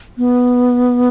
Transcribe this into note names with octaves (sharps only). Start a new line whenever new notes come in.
B3